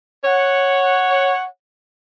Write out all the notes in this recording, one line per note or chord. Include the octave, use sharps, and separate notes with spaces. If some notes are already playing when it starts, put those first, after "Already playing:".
C#5 F#5